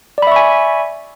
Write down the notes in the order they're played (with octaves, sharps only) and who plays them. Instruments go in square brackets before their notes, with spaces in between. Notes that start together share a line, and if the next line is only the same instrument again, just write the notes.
[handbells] D5
B5
E5
C#6
G#5